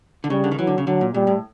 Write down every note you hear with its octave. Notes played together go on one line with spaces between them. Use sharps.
D3
C#3 G3
D3
D#3
E3 F#3
D3
C#3
D3 F#3
A#2
A#2 G3
A2